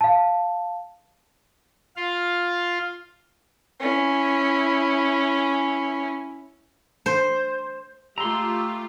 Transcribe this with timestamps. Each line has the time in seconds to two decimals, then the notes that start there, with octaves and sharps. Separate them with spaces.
0.01 F5 A5
1.97 F4 F5
3.80 C#4 E4
7.06 C5
8.18 A3 F4 G4 A#5 C6 E6